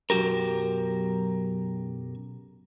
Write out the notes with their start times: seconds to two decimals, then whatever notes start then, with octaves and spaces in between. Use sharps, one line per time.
0.10 B1 F#2 F#4 G4 A#4